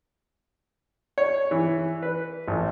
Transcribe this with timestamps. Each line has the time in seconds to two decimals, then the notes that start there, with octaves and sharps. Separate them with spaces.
1.18 C#5
1.51 E3
2.03 B4
2.48 A1